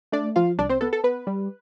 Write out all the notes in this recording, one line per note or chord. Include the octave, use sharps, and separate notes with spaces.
A3 D4 D5
F3 F4 F5
C2 D4 D5
C4 C5
B3 A4
A4
B3 B4
G3